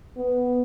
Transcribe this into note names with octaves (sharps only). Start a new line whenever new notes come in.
B3